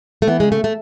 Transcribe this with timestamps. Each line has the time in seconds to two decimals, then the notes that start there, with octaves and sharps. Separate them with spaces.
0.22 A3
0.27 E3 B3
0.40 C#3 G#3
0.52 A3
0.64 A3